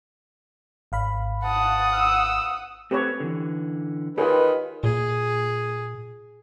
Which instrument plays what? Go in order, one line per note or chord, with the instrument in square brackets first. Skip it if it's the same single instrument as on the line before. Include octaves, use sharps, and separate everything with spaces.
[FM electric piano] G#1 F5 B5
[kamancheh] F#5 D#6 [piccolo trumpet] A5
[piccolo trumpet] E6
[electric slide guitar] A3 C4 [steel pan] G4 B4 C#5
[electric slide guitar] D3 E3
[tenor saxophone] D#3 [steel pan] F4 G#4 [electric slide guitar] G4 C#5 [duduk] B4
[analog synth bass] A#2 [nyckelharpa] G#4